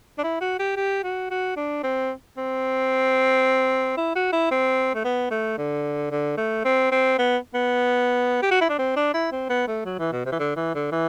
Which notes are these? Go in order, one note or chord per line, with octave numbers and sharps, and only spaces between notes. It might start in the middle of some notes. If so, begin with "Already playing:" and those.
D4
E4
F#4
G4
G4
F#4
F#4
D4
C4
C4
E4
F#4
E4
C4
A3
B3
A3
D3
D3
A3
C4
C4
B3
B3
G4
F#4
E4
D4
C4
D4
E4
C4
B3
A3
F#3
E3
B2
C3
E3
D3
E3
D3
E3